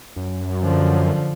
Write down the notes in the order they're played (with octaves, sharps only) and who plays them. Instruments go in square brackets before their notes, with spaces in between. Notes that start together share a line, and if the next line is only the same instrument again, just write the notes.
[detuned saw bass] F#2
[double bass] D3 F3